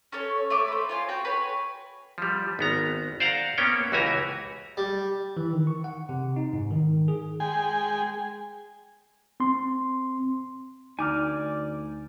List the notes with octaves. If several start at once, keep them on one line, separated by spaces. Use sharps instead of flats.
C#4 A4 C#5
A3 C#5 D6
B4 C5
F4 C#5 G#5
F#4 C#5 G5
B4 C#5 G#5
F3 G3
G#1 B3 A#5
C5 D5 F5 F#5 A#5
A#3 B3 C#4 C#5 G5
C#2 E3 F#4 G4 G#5 A#5
G3
E3
D#3
C#6
F#5
C3
D#4
G#2
D#3
G#4
G#3 G#4 G5 G#5
C4 C6
D2 D#4 D5 G#5 D6 F6